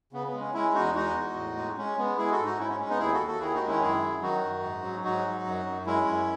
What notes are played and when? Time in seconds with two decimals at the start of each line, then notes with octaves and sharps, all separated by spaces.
0.13 C#3 B3
0.27 B3
0.34 G#3
0.40 C#4
0.54 G#3 C#4 E4
0.74 E2 D#4 F#4
0.95 G#3 D#4 F#4
1.15 E2
1.36 A2
1.56 G#3
1.77 G#3 C#4
1.98 G#3 B3
2.18 G#3 E4 G#4
2.32 F#4 A4
2.39 G#2
2.45 D#4 F#4
2.59 G#2 C#4 E4
2.70 C#4
2.80 G#3 C#4
2.89 B3 D#4
2.99 D#2 E4 G#4
3.13 F#4 A4
3.20 D#2
3.27 F#4 A4
3.40 D#3 E4 G#4
3.55 D#4 F#4
3.61 G#3
3.67 C#4 E4
3.82 F#2 E4 G#4
4.02 F#3
4.22 D#3 D#4 F#4
4.43 F#2
4.63 G#2
4.83 F#3
5.04 G#2 D#4 F#4
5.25 F#3
5.46 F#2
5.66 F#2
5.86 G#3 C#4 E4
6.07 F#2